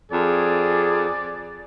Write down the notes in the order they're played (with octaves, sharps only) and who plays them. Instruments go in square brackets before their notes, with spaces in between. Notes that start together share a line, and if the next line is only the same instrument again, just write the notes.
[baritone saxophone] F2 [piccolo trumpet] G#4 [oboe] D5